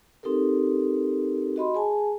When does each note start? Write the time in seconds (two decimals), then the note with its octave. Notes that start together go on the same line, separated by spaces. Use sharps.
0.23 C4 D#4 G4 A4 A#4
1.56 F#4 D#5 B5 C6
1.75 G#4 G#5 A5